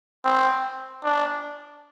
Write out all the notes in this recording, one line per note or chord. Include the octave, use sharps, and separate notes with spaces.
C4
D4